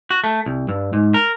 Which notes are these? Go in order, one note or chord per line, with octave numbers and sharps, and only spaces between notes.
F#4
A3
C2
G2
G#2
A#4